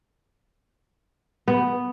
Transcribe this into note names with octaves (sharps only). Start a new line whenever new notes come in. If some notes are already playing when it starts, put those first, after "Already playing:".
B3